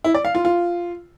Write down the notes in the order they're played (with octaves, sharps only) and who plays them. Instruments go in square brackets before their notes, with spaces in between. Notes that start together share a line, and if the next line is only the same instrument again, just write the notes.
[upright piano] E4
D5
F5
F4
F4